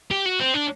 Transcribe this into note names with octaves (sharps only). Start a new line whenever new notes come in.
G4
F#4
C4
D4